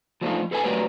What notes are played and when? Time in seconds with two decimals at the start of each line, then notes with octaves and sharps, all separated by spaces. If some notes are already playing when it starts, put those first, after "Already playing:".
0.21 F3 F#3 A3 D4 D#4 F4
0.51 G#4 A4 B4 E5 G#5
0.64 F#3 A3 G4 A#4 B4 D5